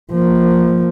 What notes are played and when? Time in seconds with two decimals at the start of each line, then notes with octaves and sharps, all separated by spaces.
0.12 F3 A#3